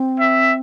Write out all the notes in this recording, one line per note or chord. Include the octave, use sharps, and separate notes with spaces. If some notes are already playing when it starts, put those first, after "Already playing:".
Already playing: C4
E5